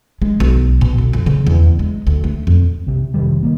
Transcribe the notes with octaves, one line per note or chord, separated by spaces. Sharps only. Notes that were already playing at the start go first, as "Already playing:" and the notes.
G#3
B1
B2
D2
F2
C#3
E2
G#3
D2
A3
F2
B1 C3
F1 C3 D#3 G3
D#3 E3 A#3